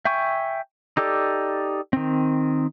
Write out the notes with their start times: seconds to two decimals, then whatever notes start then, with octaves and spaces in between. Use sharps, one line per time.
0.05 E5 G5 G#5 C#6
0.97 D#4 G4 A4 D5
1.93 D#3 C4